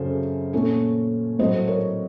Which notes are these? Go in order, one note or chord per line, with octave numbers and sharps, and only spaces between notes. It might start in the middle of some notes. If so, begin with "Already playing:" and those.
Already playing: F#2 C#3 F#3 A4 C5
A#2 A3 C#4
A2 F#3 A3 C5 D#5
A#4 C#5